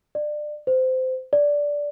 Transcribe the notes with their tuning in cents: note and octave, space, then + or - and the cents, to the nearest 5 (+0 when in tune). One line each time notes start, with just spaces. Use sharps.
D5 +25
C5 -20
D5 -10